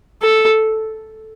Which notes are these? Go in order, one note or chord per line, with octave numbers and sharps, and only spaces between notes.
A4